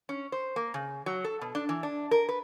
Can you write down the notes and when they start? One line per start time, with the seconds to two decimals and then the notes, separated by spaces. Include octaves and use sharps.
0.09 C#4
0.32 C5
0.56 A#3
0.74 C#3
1.06 F#3
1.24 A4
1.41 B2
1.55 D4
1.69 E3
1.83 D4
2.11 A#4
2.29 B4